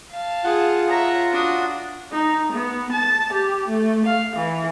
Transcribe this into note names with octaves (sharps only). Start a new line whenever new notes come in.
F5 A5
F4 G#4 F#5
C#5 E5 A#5
D4 F#4 D#6
D#4
B3
A5
G4
A3
F5
E3